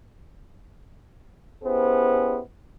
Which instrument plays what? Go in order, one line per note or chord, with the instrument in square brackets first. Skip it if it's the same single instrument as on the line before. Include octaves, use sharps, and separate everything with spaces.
[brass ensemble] B3 C#4 E4 G4 G#4 C5